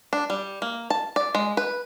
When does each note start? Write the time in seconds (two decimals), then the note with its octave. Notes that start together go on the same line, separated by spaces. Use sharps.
0.13 D4
0.30 G3
0.62 A#3
0.90 A5
1.16 D5
1.35 G#3
1.57 B4